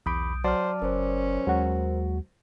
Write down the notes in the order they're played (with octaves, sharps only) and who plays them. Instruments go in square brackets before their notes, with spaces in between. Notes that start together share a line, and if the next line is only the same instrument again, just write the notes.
[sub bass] B1 [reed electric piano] E2 B5 D6 [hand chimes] D#6 G6 D7
[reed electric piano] F#3 D5 D6 [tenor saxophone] C5 [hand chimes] A5 F6
[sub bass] F#1 [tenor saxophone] C#4 [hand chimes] A#4 C5
[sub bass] D#2 [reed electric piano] F#3 G#3 F#4